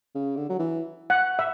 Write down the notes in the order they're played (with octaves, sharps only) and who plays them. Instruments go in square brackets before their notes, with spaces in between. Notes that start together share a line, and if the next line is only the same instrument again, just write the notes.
[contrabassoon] C#3
D3
F#3
E3
[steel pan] F#5
E5